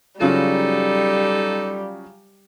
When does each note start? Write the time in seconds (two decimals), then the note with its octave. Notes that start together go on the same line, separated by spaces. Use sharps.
0.21 C#3 F#3 G3 D#4 F4 A4